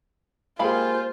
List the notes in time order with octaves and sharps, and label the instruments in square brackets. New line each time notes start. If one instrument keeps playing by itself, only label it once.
[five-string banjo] G#3 F5 B5 [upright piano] A#3 G4 G#4 [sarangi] F4 [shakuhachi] C5